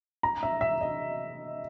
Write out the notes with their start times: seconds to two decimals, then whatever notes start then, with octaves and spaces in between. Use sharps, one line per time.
0.23 A#5
0.43 E5
0.61 E5
0.81 D#5